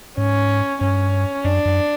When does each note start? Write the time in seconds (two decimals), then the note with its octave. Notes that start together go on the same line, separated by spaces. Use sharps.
0.17 G#2 C#4
0.81 G2 C#4
1.44 F#2 D4
1.65 F#2